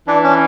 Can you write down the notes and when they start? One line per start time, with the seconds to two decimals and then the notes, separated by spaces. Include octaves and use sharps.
0.08 E3 D4
0.23 C#4